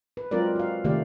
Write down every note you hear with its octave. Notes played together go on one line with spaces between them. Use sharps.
B4
F#3 G#3 C4 F4 A#4 D5
F#4 F5
C3 D#3 A3 G4 D5 F5